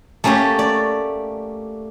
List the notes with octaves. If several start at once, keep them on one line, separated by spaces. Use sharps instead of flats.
A3 A#3 C#4 G4 A4
D5